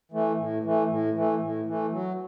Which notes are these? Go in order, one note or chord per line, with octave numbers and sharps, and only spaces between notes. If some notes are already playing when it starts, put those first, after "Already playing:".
E3 A3
A2
E3 A3
A2
E3 A3
A2
E3 A3
F#3